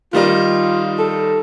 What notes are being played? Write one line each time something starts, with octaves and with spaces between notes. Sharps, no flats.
D#3 G3 D#4 F4
A4